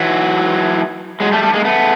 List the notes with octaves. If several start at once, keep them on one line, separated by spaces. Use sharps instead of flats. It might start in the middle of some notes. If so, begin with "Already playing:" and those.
Already playing: E3 F#3
F#3 G#3
G3 A3
G3 A3
G#3 A#3
A3 B3